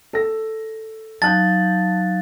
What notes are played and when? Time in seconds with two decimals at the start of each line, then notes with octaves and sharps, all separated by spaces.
0.13 A4 A#6
1.22 F#3 D#4 F5 A5 F#6 G6 A6